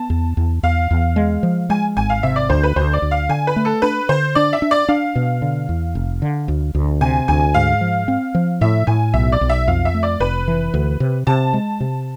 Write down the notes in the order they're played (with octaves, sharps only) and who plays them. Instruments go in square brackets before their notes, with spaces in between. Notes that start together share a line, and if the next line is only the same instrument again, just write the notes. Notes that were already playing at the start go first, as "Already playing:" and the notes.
Already playing: [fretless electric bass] B3 [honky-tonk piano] A5
[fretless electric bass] E2
E2
[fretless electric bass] E2 [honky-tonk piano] F5
[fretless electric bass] E2
G#3
F3
[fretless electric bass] G#3 [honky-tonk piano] G#5
[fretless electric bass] G#1 [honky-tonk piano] G#5
[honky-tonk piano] F5
[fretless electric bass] C3 [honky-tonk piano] E5
[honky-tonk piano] D5
[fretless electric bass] D2 [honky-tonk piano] C5
[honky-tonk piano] B4
[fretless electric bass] D2 [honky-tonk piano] C5
[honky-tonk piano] D5
[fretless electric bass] D2
[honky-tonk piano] F5
[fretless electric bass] D3 [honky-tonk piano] G#5
[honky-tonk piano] B4
[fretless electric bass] A3
[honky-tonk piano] A4
[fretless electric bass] D4 [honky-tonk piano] B4
[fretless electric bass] D3 [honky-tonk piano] C5
[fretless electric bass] D4 [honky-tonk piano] D5
[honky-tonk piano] E5
[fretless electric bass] D4
[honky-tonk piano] D5
[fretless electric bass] D4 [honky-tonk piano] F5
[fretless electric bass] B2
D3
E2
F1
D3
D2
D2
[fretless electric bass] C3 [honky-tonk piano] G#5
[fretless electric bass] D2 [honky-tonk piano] G#5
[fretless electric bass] G#2 [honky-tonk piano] F5
[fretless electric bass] F3
C4
F3
[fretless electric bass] A2 [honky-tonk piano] E5
[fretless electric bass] A2 [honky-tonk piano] G#5
[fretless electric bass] B1 [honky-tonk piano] E5
[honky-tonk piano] D5
[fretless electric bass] B1
[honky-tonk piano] E5
[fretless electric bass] F2 [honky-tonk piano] F5
[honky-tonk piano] E5
[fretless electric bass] A3
[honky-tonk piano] D5
[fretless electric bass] F1 [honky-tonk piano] B4
[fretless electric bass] E3
D2
C3
[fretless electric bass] C3 [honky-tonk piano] A5
[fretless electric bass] G#3
C3